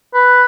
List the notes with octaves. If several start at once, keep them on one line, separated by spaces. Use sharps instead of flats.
B4